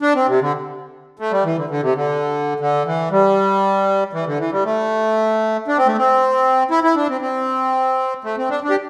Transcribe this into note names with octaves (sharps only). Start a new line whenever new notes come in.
D4
C4
C3
D3
A3
G3
E3
D3
D3
C3
D3
D3
E3
G3
E3
D3
E3
G3
A3
D4
C4
A3
C4
E4
E4
D4
C4
C4
A3
C4
D4
D4
G4